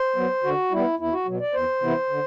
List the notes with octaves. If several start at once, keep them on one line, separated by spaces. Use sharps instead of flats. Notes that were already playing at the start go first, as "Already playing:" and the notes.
Already playing: C5
F#3 B3
D3 F#4
G3 B3 E4
E2 E4
F#4
B2 F#3
D5
E2 C5
C3 E3 B3 E4
D3